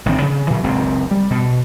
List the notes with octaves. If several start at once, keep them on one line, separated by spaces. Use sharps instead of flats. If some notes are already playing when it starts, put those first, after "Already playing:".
A1 D#3 F#3 C4
C#3
A#2 E3 F#3
F#1 C#2 C4
G3
B2